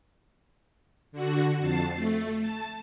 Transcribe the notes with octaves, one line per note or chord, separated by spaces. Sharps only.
D3 F#4
F2 A5 C7
A3
A5